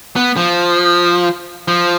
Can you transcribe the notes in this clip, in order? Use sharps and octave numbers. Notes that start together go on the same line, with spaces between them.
B3
F3
F3